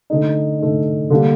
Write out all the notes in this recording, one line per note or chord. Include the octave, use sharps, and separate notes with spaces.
D3 A3 D#4
D3 A3 D#4
D3 G3 A#3 D4